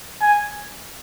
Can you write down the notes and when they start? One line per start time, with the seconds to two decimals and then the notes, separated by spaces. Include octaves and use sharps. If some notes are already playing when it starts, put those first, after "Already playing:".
0.21 G#5